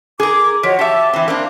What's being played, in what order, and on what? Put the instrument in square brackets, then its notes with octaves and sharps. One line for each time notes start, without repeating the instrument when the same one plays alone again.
[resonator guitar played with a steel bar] G#4 A#4 [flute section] D6
[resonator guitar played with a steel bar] F3 [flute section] F#4 C#5 D#5
[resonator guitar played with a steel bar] G4 E5 [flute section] A5 D6
[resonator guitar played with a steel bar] E3 C4 [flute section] E5
[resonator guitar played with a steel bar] A#3 C4 D4